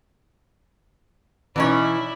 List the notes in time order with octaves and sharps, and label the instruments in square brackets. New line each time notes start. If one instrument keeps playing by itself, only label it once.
[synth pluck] B2 C#4 [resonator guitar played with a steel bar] E3 D#4 C#5 [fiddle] E4 D5